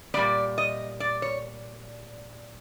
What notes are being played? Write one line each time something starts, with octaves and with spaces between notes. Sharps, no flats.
A#2 G3 B3 D5
D#5
D5
C#5